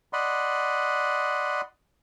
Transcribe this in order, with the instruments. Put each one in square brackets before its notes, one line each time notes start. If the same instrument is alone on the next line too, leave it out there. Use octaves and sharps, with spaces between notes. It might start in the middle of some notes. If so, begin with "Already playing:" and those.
[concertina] D5 D#5 F#5 B5 C6